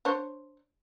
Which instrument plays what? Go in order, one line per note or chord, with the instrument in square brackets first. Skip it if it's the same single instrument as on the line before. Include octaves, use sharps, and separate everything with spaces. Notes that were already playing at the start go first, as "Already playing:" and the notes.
[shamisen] D4 C5 C#5